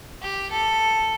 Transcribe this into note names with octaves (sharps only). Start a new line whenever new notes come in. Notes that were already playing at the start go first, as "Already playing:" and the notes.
G4
A4